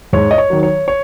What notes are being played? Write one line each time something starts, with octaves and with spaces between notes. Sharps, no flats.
G#2 C#5
D#5
C#5
D#3 F#3
C#5
C#5